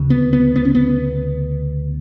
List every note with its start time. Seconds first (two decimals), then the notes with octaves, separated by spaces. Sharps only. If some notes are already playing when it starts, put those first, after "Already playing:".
Already playing: D2 C#3
0.10 B3
0.33 B3
0.56 B3
0.65 C#4
0.75 B3